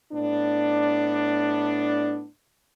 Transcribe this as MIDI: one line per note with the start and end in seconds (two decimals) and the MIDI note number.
0.13 2.26 45
0.13 2.26 59
0.13 2.26 62